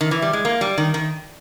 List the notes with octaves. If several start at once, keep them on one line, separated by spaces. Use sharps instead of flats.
D#3
E3
G3
G#3
A#3
G3
D#3
D#3